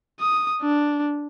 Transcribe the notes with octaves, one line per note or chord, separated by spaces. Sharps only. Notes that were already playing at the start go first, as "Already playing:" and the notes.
D#6
D4